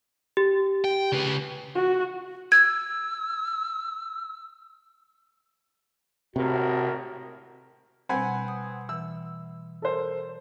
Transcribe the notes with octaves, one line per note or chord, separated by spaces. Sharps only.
G4
G5
C#3 B4
F#4
E6 G#6
G#1 A2 C3 F#4 A#4
B2 G3 C4 F#5 G#5 B5
D#6
E3 E6
A4 A#4 C5